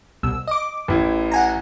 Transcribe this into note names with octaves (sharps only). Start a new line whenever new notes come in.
C2 B2 E6
D#5 D6
A1 E4
F#5 G#5 A#5